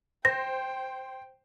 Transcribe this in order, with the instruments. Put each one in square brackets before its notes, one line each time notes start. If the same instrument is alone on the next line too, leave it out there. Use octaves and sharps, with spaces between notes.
[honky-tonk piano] C5 [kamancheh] G5 [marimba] A#6